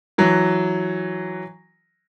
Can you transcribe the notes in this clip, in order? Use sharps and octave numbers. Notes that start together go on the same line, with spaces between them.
E3 F#3